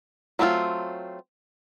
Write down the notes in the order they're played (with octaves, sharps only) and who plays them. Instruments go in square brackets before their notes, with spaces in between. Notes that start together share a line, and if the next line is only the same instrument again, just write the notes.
[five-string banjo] F#3 A3 C4 E4 F4